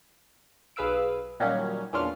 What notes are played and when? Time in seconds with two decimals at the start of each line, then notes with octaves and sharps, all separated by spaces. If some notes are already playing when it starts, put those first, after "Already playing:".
0.76 B1 G#4 B4 F5 E6 D7
1.40 A#2 D#3 F#3 G3 A#3 C#4
1.93 E2 A#2 C#4 D4 F4 F6